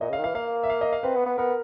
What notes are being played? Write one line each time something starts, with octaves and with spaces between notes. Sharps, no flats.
A#2 D#5
C#3
F5
D#3
E3 F5
A#3 F5
E5
F5
D#5
F5
C4 B4
B3
B3
B3 A#4